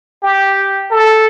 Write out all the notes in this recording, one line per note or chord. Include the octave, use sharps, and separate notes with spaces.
G4
A4